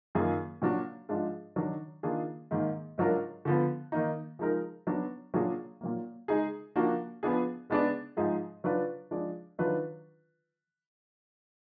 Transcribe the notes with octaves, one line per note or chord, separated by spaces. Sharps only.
F#2 D#3 A#3 F4 G#4
A#2 F#3 D4 F#4
G#2 F3 G#3 D4 F4
D#3 F#3 D4
D#3 A#3 D4 F4 G#4
G#2 D#3 A#3
G#2 F#3 D4 F4 A#4
D3 F3 B3
D#3 A#3 D#4
F3 G#3 D#4 A#4
F#3 B3 D4
A#2 F#3 D4 F4 G#4
A#2 F#3 A#3
G#3 D#4 G#4
F3 A#3 D4 F#4
F3 B3 D4 G#4
G#3 B3 D4 G#4 D5
G#2 F3 G#3 D#4 G#4
F#3 D4 F4 B4 D5
F3 G#3 D4 G#4 D5
D#3 F#3 D4 F4 B4